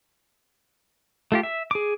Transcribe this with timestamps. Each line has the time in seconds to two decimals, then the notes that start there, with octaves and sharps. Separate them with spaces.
1.32 A3 F4 G4
1.43 E5
1.71 G#4 D6